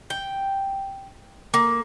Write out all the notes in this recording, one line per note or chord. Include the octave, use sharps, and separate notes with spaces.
G5
A#3